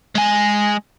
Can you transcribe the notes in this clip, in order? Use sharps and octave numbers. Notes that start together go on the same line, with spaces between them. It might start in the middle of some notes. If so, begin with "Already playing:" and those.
G#3 G#5